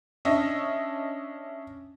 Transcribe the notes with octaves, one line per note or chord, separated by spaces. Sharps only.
C#4 D4 D#5 E5